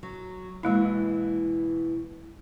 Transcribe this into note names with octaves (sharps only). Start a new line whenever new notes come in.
F#3
B2 E3 G#3 A#3 E4